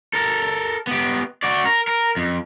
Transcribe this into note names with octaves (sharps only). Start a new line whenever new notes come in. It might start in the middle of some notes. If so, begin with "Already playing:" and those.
A4 A#4
B3 G4
F#4 D5
A#4
A#4
F2